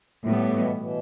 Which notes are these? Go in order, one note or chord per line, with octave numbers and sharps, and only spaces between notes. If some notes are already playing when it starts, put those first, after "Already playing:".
A2 G3 B3
B2 E3
B2 E3